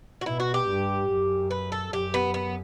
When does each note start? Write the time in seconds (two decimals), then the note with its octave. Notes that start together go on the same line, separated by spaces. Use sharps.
0.21 F#4
0.26 B2 E4
0.40 F#4
0.54 G4
0.68 G2
1.09 F#2
1.51 B4
1.72 A4
1.92 F#2 G4
2.14 B3
2.34 B3